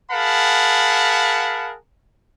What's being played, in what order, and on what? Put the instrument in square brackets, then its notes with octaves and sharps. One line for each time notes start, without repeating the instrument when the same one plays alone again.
[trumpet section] G#4 A#4 F5 F#5 A5 B5